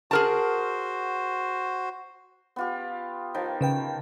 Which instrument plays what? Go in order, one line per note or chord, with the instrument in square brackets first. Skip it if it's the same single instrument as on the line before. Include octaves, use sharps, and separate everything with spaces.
[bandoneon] F#4 C5 [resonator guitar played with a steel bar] G#4 A#4 A5
[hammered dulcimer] B3 F4 G4
D#3 F3
[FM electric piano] C#3 B4 G5